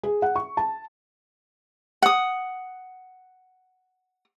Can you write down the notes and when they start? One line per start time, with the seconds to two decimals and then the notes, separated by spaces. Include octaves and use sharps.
0.03 G#4
0.22 F#5
0.36 C#6
0.57 A5
2.02 F#5 D#6